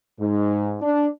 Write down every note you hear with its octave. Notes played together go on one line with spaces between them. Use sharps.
G#2
D4